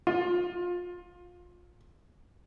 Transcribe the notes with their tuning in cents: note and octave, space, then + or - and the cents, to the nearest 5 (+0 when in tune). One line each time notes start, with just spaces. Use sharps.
F4 +25